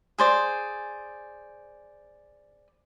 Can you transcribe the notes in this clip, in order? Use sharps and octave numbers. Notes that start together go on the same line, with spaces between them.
G#4 C5 D5